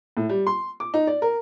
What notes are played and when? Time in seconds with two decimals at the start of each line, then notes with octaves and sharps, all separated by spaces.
0.17 A2
0.29 G3
0.47 C6
0.80 D6
0.94 D#4
1.07 D5
1.22 A#4